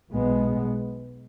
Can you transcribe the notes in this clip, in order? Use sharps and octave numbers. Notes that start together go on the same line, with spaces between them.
B1 B2 G#3 B3